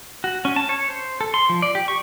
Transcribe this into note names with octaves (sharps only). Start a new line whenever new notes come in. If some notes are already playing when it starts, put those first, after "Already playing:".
F#4
C#4
A5
C#5
C5
A4
C6
F3
D5
G4
C#6